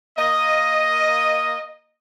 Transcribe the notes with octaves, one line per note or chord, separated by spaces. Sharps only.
A#3 D#5